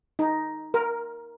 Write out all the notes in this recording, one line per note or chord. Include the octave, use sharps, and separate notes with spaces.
D#4
A#4